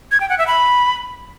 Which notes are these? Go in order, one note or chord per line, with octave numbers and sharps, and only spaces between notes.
G#6
G5
F#5
E5
B5